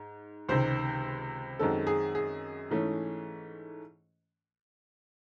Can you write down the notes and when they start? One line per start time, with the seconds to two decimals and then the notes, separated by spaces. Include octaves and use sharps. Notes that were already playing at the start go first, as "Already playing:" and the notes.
Already playing: G#2
0.49 C#2 C3 D#3 C5
1.59 F#2 D#3 G#3 C4 A4
1.87 G#4
2.15 G#4
2.70 G#2 E3 A3 C#4